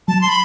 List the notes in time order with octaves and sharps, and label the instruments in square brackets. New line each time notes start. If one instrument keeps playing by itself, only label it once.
[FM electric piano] F#3 [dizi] A5
[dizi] C6
B5